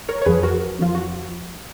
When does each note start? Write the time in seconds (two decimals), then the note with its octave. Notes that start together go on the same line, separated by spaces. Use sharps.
0.09 A#4 C#5
0.22 C#5
0.26 F2 F3 G#4 B4
0.43 F#4 A#4
0.79 F2 F3 F4
0.95 F#4